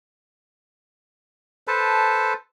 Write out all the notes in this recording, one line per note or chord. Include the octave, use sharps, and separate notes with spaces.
A4 B4 C5 A5